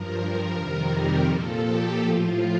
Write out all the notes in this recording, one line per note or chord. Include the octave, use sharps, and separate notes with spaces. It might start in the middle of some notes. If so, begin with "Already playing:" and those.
Already playing: G2 F3 A#4
A#4
F2 C3 D#3 G3
A#2 F3 A4
G4
A2 F3 F4